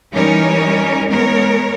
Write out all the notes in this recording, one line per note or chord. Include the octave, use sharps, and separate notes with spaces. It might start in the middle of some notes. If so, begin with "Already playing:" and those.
E3 G3 C#4 D#4 A#4 C#5
G#3 B3 A#4 C#5